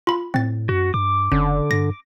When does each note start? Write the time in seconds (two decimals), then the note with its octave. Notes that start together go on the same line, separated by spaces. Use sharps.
0.07 F4 B5
0.34 A2 C4 A6
0.69 F#2 F#4
0.94 G2 D6
1.32 F#1 D3 C#4
1.71 G2 A#6